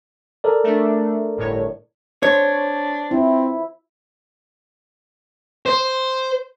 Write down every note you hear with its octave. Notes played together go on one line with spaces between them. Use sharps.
A4 A#4 D5
A3 D4
G1 A2 C#5
D4 C5 C#5
C4 E4 F4
C5